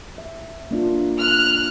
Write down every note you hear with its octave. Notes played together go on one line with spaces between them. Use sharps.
E5
A#3 D4 F4
F6 F#6